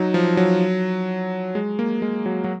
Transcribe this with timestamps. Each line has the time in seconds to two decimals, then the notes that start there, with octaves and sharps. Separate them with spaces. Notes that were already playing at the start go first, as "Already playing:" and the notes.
Already playing: F#3 D#4
0.14 F3
0.37 F#3
1.55 G#3
1.79 A#3
2.02 G#3
2.26 F#3
2.44 F#3